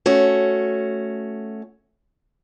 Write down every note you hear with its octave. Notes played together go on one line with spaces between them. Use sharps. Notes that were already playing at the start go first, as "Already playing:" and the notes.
A3 C#4 F#4